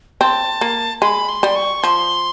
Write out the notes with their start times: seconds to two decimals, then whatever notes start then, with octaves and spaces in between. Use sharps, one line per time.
0.21 C4 A5
0.61 A#3
1.02 G#3 B5
1.29 C6
1.43 G3
1.56 C#6
1.82 F3 C6